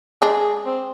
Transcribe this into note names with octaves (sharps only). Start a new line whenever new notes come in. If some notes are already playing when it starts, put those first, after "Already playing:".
G#3 D4 G#4
C4